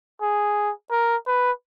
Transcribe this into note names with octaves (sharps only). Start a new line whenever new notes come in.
G#4
A#4
B4